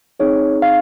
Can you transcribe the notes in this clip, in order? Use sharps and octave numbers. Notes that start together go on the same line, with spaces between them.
C4 D#4 G#4 C#5
F5